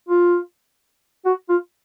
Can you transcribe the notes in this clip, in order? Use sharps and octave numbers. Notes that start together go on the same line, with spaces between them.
F4
F#4
F4